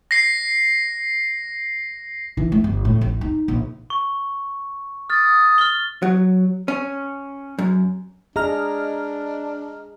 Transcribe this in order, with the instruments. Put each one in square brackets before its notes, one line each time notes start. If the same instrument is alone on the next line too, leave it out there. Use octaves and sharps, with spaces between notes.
[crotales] A#6 C7
[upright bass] E3
A3
G1
A2
A1
D#4
A#1
[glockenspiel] C#6
[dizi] D#6 [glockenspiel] F6 A6
[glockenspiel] F6 G7
[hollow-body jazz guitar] F#3
C#4
F#2
[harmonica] D4 [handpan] G#4 [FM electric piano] D#5 A#5 F6